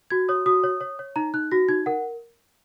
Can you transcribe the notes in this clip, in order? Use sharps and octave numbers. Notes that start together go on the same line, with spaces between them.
F#4 G#6
C#5 D#6
F#4 D#6
C#5
C#5
C#5
D#4 A#5
D#4 F#6
F#4 A#6
D#4 G#6
A#4 F#5